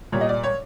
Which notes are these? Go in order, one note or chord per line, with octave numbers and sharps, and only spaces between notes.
A#2 G3 C#5
D#5
D5
C#5